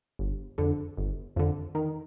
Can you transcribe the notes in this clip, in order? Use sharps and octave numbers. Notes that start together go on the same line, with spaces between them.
G1
F2 D3
G1
F2 D3
D#3